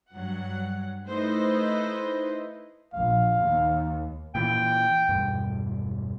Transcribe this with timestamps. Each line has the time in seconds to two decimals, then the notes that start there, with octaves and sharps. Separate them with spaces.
0.13 G2 F#3 F#5
1.08 A3 D#4 E4 B4 C5 D#5
2.94 A#1 F5
3.40 D#2
4.35 A#2 E3 G5
5.09 E1 G2